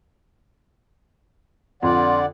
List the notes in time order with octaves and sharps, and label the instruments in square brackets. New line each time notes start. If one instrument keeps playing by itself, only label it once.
[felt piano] F2 [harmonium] D3 D5 F#5 [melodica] F4